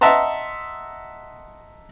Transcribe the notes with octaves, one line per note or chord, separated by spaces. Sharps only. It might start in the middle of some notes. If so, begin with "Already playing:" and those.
D#5 E5 F#5 A5 A#5 C6